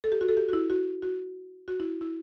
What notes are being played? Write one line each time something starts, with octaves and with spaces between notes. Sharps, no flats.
A4
G4
F#4
A4
G4
F#4
E4
F#4
F#4
F#4
E4
E4